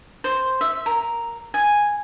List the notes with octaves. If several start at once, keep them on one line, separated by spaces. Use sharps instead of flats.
C5
E5
A#4
G#5